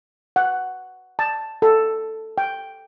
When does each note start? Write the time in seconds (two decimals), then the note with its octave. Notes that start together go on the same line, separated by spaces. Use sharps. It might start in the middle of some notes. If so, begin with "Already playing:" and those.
0.36 F#5
1.19 A5
1.62 A4
2.38 G5